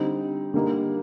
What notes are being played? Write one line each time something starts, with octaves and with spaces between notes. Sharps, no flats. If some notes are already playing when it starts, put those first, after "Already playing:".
Already playing: D3 G3 C4 D#4
D3 G3 A#3 D#4